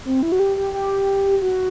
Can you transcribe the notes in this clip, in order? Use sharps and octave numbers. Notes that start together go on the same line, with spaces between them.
C4
E4
F#4
G4
G4
G4
F#4